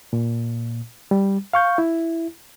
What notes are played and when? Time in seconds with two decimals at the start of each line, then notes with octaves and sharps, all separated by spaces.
0.13 A#2
1.11 G3
1.53 F5 C#6 G6
1.78 E4